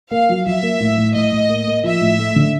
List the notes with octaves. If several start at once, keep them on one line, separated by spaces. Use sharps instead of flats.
A#3 F5
F#3
F#3 E5
A#3
A2
A2
A2 D#5
A2
A#3
A#3
F3 E5
A2
A3
D3